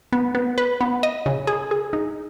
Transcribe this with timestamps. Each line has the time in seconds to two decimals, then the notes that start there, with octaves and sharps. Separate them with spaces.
0.13 B3
0.35 B3
0.58 B4
0.81 B3
1.03 D#5
1.26 C#3
1.47 G#4
1.71 G#4
1.93 D#4